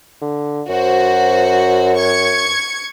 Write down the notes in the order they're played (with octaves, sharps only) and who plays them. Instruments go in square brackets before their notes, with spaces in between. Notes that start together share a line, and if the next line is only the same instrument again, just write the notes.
[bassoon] D3
[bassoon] F#2 [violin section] F#4 C5
[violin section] C#6 G#6 C#7